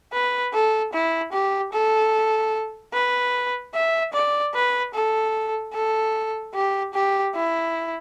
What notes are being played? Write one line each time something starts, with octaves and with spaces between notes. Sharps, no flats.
B4
A4
E4
G4
A4
B4
E5
D5
B4
A4
A4
G4
G4
E4